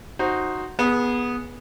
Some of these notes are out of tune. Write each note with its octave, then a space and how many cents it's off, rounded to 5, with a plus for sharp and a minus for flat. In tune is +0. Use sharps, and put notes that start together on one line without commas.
D#4 +0 F#4 +0 C5 +10
B3 -15 G#4 +0